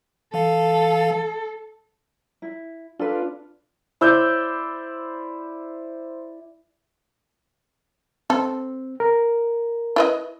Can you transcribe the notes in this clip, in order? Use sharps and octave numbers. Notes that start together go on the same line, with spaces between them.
E3 A4 F5
E4
D4 F4 A4 B4
E4 C5 D5 E6 G6
C4 A4
A#4
E4 B4 D#5